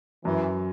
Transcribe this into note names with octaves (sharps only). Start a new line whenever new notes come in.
F#2 E3